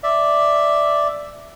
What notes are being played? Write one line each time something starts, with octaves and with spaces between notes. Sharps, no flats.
D5 E5